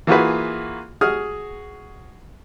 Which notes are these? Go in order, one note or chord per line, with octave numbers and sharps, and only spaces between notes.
E3 A#3 F4 F#4 G#4 B4
F#4 G#4 D#6 F6